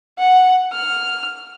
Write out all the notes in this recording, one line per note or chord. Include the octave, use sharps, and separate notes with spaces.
F#5
F6